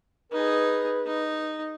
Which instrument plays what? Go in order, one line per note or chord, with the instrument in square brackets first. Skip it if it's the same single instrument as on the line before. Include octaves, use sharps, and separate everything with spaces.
[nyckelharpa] D#4 G#4 [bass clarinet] B4
[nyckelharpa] D#4